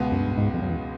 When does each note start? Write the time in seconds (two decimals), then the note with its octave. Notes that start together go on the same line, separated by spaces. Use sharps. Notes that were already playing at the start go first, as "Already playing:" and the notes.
Already playing: C#2 B2 G#3 B3
0.12 F#2
0.21 G2
0.38 G#2
0.54 F2
0.62 F#2
0.70 E2